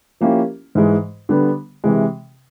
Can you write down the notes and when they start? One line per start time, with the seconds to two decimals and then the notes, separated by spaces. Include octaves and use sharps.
0.21 F3 A#3 C#4 E4 G4
0.75 G#2 E3 G#3
1.29 D3 G3 B3 D4
1.84 C3 E3 G#3